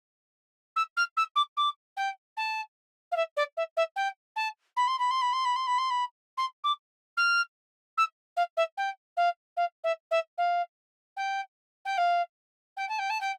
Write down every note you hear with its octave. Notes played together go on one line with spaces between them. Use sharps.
E6
F6
E6
D6
D6
G5
A5
F5
E5
D5
E5
E5
G5
A5
B5
C6
B5
C6
B5
C6
B5
C6
B5
C6
B5
C6
D6
F6
E6
F5
E5
G5
F5
F5
E5
E5
F5
G5
G5
F5
G5
A5
G5
A5
G5